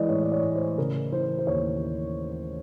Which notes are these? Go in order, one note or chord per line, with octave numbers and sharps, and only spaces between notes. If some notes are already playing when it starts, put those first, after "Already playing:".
Already playing: E3 G#3 D5 D#5
A2 C#5
D5
C#5
A2
C5
C#3 A#4
E3 C5
C5
D#2 C#5